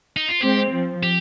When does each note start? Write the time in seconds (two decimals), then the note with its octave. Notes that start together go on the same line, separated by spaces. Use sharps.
0.17 D#4
0.28 F4
0.41 G#3 C4 G4
0.72 F3
1.03 G4